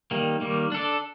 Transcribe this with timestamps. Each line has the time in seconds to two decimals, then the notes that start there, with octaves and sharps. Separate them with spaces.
0.11 D#3 G3 A#3
0.41 D#3 G3 A#3
0.72 D4 A4 D5